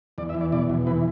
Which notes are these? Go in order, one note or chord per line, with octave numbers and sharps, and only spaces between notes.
E2 D5
E5
E3
D5
B2 D5
E2
E3 B4